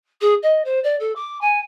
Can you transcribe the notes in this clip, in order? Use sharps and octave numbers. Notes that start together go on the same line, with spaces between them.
G#4
D#5
C5
D5
A4
D6
G#5